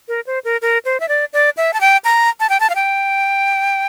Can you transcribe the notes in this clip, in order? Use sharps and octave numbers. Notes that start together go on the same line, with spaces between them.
A#4
C5
A#4
A#4
C5
E5
D5
D5
E5
A5
G5
A#5
A5
G5
A5
F5
G5